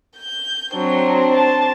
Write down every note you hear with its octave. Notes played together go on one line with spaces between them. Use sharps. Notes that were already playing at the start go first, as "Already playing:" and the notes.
G6
F#3 C4 D4
A5